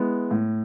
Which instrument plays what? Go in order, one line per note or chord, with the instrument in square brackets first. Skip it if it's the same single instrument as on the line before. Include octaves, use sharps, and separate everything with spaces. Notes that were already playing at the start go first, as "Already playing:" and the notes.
Already playing: [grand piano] G#3 B3 E4
A2